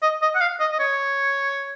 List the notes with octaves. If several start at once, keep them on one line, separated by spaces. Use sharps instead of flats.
D#5
D#5
F#5
F5
D#5
D#5
C#5